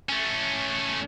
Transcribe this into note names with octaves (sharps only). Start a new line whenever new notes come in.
A3 C#4